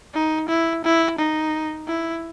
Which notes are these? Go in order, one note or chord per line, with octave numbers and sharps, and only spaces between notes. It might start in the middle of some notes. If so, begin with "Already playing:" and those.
D#4
E4
E4
D#4
E4